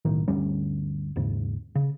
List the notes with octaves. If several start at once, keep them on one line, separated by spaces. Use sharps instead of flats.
B1 A2 D#3
G1 D2 G3 C#4
D#2 G#2 C#3
C#3